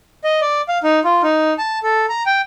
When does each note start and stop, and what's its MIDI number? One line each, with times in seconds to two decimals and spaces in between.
0.24 0.40 75
0.41 0.61 74
0.68 0.78 77
0.83 1.00 63
1.04 1.22 65
1.23 1.53 63
1.58 1.79 81
1.83 2.06 69
2.09 2.23 82
2.26 2.41 79